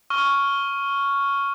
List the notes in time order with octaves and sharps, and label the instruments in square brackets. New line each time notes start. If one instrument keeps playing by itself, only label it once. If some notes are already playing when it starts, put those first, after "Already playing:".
[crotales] C#6 F6